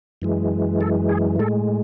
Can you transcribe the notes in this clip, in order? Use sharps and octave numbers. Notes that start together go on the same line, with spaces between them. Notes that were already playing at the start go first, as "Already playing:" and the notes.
F#2 E3 G#3
A4
G#4
A2 G#3 A4